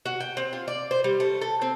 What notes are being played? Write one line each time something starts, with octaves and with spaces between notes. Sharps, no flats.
F#4
G5
C4
F4
D5
C5
G3
A3
A4
C4